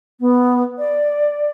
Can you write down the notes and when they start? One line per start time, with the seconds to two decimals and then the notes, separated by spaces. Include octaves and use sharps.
0.20 B3
0.78 D5